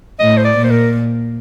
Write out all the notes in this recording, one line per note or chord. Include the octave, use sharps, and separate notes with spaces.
A2 D#5
C5
D5
A#2
C5
A#4